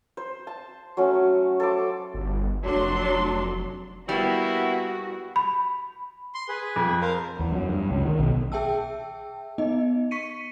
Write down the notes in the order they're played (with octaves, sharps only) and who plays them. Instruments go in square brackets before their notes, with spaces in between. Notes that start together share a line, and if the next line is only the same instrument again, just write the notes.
[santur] C5
A5
F#3 A3 C#4
A4 C5 D6
[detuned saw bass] G1
[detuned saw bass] F1 [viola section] F#3 D4 C6
[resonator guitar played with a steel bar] G3 [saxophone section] A#3 E4 [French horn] B3 [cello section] F#4
[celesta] B5
[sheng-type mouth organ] C6
G#4 B4
[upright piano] F2
[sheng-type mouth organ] A#4 C5 F5
[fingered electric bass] E2
F#2
G2
C#2
D#3
B1
[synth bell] G#4 E5 G5 A5 E6
B3 D#4 D#5
C#6 B6 C#7 D#7